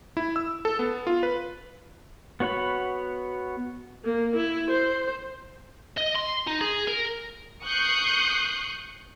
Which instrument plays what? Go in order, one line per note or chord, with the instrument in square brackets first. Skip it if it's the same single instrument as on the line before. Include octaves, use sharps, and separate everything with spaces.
[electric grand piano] E4
E6
A4
B3
F4
B4
[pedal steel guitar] B3 F#4 C#5 F#5 B5
[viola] A#3
E4
C5
[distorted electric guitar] D#5
C6
D#4
G#4
A#4
[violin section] C#6 D#6 F#6 G6 C7